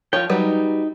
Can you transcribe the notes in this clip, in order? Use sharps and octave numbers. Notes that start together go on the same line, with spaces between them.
F3 F4 C#5 G5
F#3 G3 D#4 B4